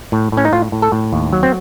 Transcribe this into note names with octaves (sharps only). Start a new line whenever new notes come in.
A2
A2 C#4
D#4
A2 F4
A2
A4
A2
D#2
F#3
C4